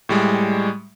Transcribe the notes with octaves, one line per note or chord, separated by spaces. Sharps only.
A2 G3 G#3